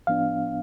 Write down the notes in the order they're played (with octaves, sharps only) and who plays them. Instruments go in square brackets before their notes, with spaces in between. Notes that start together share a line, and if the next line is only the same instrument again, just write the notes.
[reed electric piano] A2 F3 B3 D4 F5